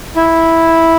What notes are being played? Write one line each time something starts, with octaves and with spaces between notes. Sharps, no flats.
E4